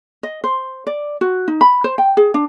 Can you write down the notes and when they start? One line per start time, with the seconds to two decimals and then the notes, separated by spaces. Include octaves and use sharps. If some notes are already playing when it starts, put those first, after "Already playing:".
0.23 D#5
0.44 C5
0.87 D5
1.21 F#4
1.48 D#4
1.61 B5
1.84 C5
1.98 G5
2.17 G#4
2.34 D4